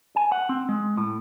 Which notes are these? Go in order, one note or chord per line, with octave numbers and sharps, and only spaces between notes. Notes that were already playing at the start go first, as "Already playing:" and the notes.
G#5
F#5
C4
G#3
A2